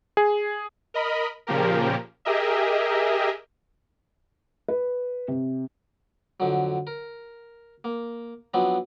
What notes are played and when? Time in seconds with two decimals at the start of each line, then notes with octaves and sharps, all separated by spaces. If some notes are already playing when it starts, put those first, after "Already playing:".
0.17 G#4
0.94 A#4 D#5 B5
1.47 A#2 C#3 F3 A#3 G4 A#4
2.25 G4 G#4 A#4 D#5 E5
4.68 B4
5.28 C3
6.40 F2 D3 F#3
6.87 A#4
7.84 A#3
8.54 F3 F#3 B3 C4 D4